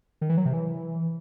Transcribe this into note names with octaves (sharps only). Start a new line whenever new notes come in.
D#3
E3
F#3
C3
E3